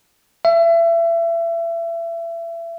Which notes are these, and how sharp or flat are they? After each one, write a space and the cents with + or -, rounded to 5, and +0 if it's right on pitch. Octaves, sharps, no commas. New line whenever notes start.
E5 +30